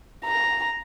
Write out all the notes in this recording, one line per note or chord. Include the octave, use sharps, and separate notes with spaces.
A#5